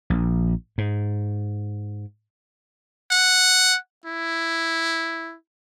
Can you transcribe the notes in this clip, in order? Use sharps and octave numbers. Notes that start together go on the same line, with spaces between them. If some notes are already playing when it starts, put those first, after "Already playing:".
A#1
G#2
F#5
E4